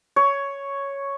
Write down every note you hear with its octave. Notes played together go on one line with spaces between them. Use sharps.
C#5